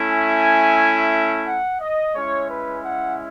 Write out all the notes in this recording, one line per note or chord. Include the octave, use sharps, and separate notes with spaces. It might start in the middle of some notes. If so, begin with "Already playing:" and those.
Already playing: A3 C#4 E4
G#5
F#5
D#5
G#3 C#4 E4 C#5
B4
F#5